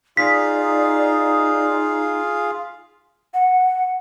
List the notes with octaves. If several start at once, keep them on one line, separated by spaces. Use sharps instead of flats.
D#4 F4 G#4 D5 F5 B6
F#5